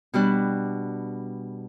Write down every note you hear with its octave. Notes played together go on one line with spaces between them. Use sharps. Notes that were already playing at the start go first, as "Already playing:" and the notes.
B2 G3 D4 F#6